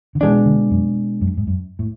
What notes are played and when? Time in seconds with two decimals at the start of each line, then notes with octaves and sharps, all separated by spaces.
0.15 D3
0.21 B2 E3 G#3 D4
0.46 D3
0.71 F#2
1.21 F#2
1.37 G#2
1.47 F#2
1.79 A2